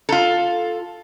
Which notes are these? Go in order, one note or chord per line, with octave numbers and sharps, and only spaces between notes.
F4 A4